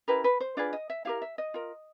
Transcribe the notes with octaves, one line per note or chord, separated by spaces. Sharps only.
C#4 E4 G4 A#4 B4
B4
C5
D4 F4 G#4 B4 D5
D#5
E5
E4 G4 A#4 F5
E5
D#5
F4 A#4